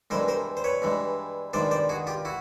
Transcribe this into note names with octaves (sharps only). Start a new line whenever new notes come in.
G2 E3 G#3 A#4 C5
A#4 C5
C5
B4 C#5
G2 E3 G#3
G2 D#3 G#3 C5 D5
C5 D5
F#4 G#4
F4 G4
E4 F#4